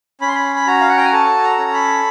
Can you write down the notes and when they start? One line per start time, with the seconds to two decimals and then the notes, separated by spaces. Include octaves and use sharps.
0.21 C#4 B5
0.28 C6
0.35 B5
0.56 B5
0.67 F#4 A#5
0.81 F5
0.89 F#5
0.97 G5
1.05 G#5
1.13 A4 A5
1.44 A#5
1.59 C#4
1.73 B5